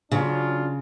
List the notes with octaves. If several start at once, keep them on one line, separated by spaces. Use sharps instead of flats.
C#3 F#3 D4 F4